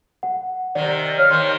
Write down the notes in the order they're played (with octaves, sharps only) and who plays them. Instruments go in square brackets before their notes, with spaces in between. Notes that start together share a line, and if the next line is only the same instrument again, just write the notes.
[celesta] F#5
[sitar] C3 D#3 [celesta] D5
[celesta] C#5 [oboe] F5
[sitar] D#2 D#3 [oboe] C5